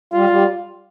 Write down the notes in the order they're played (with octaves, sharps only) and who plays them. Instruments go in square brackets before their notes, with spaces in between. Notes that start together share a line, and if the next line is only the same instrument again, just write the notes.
[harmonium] G3 [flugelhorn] F4
[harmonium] G3